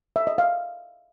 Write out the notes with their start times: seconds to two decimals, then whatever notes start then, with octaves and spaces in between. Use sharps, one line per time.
0.16 E5
0.27 D#5
0.38 F5